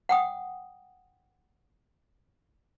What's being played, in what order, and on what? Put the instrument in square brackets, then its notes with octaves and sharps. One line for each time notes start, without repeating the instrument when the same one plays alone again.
[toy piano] F#5 G5 D#6